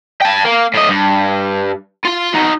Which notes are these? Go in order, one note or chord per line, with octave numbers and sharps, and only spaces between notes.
G5 A5
A#3
A2 D#5
G2
F4 C6
D#4 F#4